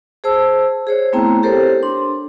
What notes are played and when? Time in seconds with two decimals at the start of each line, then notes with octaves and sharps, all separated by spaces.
0.24 G#4 C5 A5 E6
0.87 G#4 C5 C#5
1.13 A3 B3 C4 E4 G5 A#5
1.43 G4 A4 A#4 C5 C#5
1.83 D4 C6